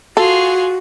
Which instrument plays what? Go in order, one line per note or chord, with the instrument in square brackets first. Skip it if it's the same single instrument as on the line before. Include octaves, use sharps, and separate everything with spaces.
[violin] F4 G#4 [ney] F#4 [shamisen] A4